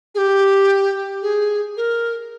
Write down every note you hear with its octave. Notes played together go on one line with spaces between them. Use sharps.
G#4
G4
G#4
A#4